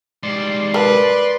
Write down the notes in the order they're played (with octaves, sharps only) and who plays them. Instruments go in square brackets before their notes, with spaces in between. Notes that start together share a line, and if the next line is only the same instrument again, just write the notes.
[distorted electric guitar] G#2 G3 [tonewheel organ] D5 C6
[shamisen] A#4 A5 [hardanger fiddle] B4